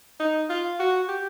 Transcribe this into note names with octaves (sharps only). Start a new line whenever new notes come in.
D#4
F4
F#4
G4